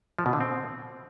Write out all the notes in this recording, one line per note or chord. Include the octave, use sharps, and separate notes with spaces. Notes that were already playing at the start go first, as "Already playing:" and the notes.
F3
B2
D3
C4